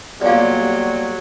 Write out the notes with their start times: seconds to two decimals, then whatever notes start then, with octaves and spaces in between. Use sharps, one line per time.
0.21 B1 A#2 F#3 G3 D5 F5